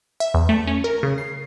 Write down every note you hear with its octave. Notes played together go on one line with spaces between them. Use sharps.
E5
E2
A3
C#4
A#4
C#3
C7